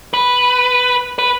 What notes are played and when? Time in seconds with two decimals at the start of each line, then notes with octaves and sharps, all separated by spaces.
0.14 B4
1.19 B4